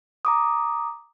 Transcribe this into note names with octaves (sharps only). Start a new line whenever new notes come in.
A#5 D6 D#6